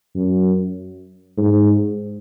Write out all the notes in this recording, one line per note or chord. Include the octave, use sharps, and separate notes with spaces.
F#2
G#2